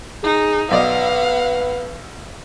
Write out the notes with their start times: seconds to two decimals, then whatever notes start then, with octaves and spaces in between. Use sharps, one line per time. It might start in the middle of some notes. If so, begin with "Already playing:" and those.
0.23 D#4 G#4
0.71 B1 B4 D5 D#5 F5 F#5